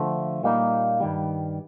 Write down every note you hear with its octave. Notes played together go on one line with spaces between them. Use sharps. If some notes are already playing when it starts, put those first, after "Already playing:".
Already playing: D3 F3 A3
A#2 G3 A#3 D#4
G2 D#3 G3